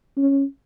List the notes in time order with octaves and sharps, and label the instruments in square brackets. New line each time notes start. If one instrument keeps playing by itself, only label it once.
[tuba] C#4